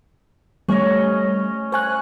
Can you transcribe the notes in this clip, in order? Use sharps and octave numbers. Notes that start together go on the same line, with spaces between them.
G3 A3 C#4 C#5 D#5
C5 G#5 C#6 F#6